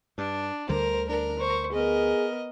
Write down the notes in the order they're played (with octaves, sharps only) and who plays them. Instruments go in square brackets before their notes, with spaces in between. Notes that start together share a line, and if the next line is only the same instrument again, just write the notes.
[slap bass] G2 [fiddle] D4
[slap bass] D2 D3 G3 [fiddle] A#4 [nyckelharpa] C5
[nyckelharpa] D4 [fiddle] A#4
[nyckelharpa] C5 C#6
[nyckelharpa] B3 A#4 [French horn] G#4 [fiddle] D#5